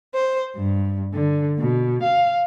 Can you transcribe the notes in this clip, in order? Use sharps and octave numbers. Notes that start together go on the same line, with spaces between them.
C5
G2
D3
B2
F5